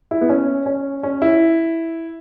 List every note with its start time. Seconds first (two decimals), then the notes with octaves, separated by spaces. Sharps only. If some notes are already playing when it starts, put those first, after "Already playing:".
0.11 E4
0.21 B3
0.29 C#4
0.66 C#4
1.03 C#4
1.22 E4